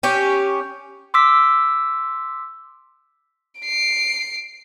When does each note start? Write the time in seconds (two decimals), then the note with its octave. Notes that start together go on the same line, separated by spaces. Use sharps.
0.03 C#4 G4
1.14 C6 D6 E6 B6
3.61 C7 D7